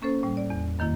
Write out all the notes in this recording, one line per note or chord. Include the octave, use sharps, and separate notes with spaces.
A#3 C#4 A4 C5
A2 G3
D5
E2
F#2 D#3 A#3 E4